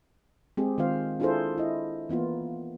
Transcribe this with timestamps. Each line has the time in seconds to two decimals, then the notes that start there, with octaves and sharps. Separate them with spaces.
0.57 G#3 C4 G4 G#4
0.78 D#3 G#3 C4 F4 C5 F5
1.20 D4 E4 F4 G#4 A4 C5
1.58 E4 D#5
2.09 E3 A#3 B3 F4